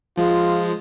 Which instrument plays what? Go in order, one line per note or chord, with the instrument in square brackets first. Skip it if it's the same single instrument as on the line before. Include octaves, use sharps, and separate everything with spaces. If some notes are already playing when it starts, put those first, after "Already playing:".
[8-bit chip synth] F3 G#3 [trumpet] F4